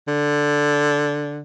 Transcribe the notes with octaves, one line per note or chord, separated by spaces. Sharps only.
D3